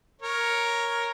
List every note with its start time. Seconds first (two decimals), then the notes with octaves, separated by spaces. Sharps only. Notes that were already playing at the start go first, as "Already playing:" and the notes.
0.21 A#4 C#5